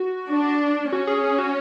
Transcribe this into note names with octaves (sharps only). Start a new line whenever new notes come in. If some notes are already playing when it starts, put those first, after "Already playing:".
Already playing: F#4
D4
C#4 F#4
G#4
G#4
F#4